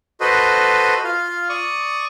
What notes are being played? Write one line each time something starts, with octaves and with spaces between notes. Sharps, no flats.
F#4 A4 B4 C5 D#5
F4 F5
D5 C#6 D#6